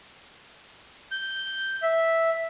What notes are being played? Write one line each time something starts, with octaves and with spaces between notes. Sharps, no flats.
G6
E5